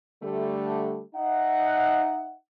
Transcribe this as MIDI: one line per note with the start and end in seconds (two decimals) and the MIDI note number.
0.23 1.00 50
0.23 1.00 55
0.23 1.00 57
1.14 2.34 63
1.14 2.34 76
1.14 2.34 78